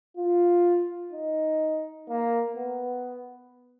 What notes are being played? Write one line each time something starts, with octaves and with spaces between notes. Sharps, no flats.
F4
D#4
A#3
B3